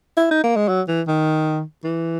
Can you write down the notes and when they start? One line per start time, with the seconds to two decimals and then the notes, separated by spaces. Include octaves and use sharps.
0.18 E4
0.31 D#4
0.44 A#3
0.56 G#3
0.68 F#3
0.88 E3
1.08 D#3
1.84 E3